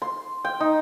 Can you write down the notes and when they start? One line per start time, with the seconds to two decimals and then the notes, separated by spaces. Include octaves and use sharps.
0.02 C6
0.45 G5
0.60 D#4